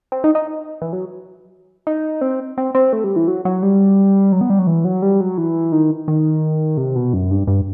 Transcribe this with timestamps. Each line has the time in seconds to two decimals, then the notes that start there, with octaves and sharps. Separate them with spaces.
0.12 C4
0.24 D#4
0.35 D#4
0.82 E3
0.93 F#3
1.87 D#4
2.21 C4
2.58 C4
2.75 C4
2.93 A3
3.04 G3
3.16 E3
3.28 F#3
3.45 F#3
3.62 G3
4.32 F#3
4.41 B3
4.50 G3
4.59 F#3
4.67 E3
4.85 F#3
5.02 G3
5.21 F#3
5.38 E3
5.72 D#3
6.08 D#3
6.77 C3
6.95 B2
7.13 F#2
7.31 G2
7.47 G2